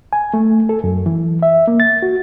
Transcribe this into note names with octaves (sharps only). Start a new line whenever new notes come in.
G#5
A3
A4
F#2
E3
E5
A#3
A6
F#4